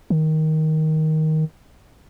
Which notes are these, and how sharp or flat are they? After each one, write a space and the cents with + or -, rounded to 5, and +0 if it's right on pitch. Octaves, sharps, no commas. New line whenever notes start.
D#3 +10